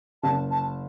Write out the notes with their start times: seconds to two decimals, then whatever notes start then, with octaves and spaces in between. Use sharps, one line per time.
0.23 F#1 A5
0.51 A5